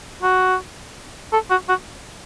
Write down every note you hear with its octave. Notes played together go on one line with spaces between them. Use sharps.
F#4
A4
F#4
F#4